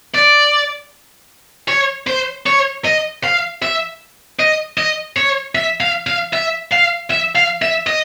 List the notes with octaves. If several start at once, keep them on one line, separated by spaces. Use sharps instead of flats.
D5
C#5
C5
C#5
D#5
F5
E5
D#5
D#5
C#5
E5
F5
F5
E5
F5
E5
F5
E5
D#5